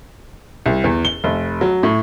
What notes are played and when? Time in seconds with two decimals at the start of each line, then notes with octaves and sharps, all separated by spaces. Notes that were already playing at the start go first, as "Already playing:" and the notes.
0.66 C2
0.84 E2
1.05 G7
1.24 F1
1.61 F#3
1.83 A2